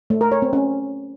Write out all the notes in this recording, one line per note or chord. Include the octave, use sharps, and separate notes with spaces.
A3
A#4
C#5
C4
C#4